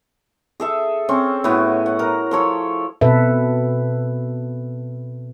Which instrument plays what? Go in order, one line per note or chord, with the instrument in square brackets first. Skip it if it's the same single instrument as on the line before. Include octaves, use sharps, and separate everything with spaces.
[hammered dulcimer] G#4 A4 E5
C4 C#4
A2 B3 F#4
F#5
A#4 A#5
F3 A4 C#5
[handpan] B2 C4 A4 B4 E5